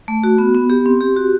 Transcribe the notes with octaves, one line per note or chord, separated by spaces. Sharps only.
A3
F#4
B3
B3
G4
C4
G4
F#4